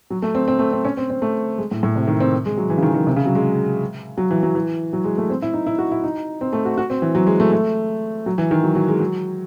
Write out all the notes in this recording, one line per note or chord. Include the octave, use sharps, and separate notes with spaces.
F#3
A3
C4
C4
A3
C4
C#4
C4
C4
A3
G#3
A2
A2
C3
D#3
C4
G#3
F#3
E3
C#3
D#3
D#3
C3
C#3
F#3
G#3
F#3
E3
F#3
E3
F#3
G#3
A3
C4
E4
D#4
E4
F#4
E4
D#4
C4
A3
F#4
F#4
C4
E3
F#3
G#3
A3
A3
F#3
E3
D#3
F#3
F#3
G#3
F#3